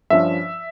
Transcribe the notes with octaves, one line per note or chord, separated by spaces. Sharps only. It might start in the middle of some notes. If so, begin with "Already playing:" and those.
G2 F3 C#4 E5